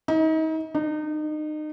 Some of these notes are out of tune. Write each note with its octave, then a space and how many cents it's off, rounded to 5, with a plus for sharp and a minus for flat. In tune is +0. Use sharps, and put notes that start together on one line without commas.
D#4 +35
D#4 -30